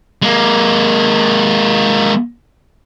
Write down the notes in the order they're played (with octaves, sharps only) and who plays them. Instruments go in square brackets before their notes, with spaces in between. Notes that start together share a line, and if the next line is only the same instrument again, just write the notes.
[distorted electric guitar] G#3 A#3